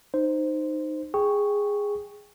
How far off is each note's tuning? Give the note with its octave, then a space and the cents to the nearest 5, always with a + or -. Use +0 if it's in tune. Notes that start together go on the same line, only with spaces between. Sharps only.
D#4 -15 C5 -5
G#4 -10 G5 +0 C#6 +0